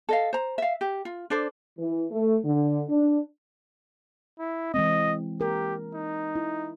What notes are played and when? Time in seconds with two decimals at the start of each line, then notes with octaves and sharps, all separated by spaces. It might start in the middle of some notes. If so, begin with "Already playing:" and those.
0.09 A4 D#5 F5
0.33 C5 A#5
0.58 E5 F5
0.81 G4
1.05 F4
1.30 D4 A4 C5 D5
1.79 E3
2.11 A3
2.45 D3
2.89 D4
4.39 E4
4.74 E3 G#3 C4 D#5
5.41 G4 A#4
5.94 D#4
6.36 E4